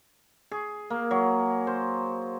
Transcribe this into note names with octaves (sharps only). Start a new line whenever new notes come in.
G#4
A#3
F#3
C5